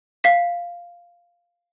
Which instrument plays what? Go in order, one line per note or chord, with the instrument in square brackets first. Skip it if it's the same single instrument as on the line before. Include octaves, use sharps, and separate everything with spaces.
[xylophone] F5 B6